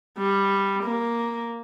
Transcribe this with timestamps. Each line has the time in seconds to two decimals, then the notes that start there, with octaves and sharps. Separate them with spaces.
0.18 G3
0.84 A#3